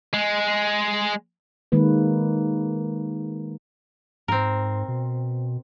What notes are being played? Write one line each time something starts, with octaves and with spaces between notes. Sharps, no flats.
G#3
D#3 G#3 A#3 B4
G#2 C4 A#4
B2